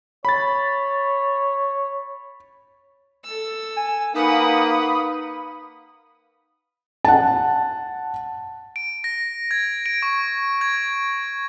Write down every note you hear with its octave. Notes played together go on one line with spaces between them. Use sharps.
C#5 B5 A6
A4 E6
G#5
A#3 D#4 B4 F5 F#5 B5 D#6
F#5 A5
D7
A#6
G#6
D7
C#6
G#6